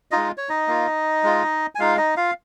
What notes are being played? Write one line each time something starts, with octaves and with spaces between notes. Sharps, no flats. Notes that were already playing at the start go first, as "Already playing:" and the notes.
G#3 D#4 F4 D#5
C#5
D#4 D#5
A#3 F4
G#3 F4
G#5
G#3 D#4 F4 F5
D#4 D#5
F4 F5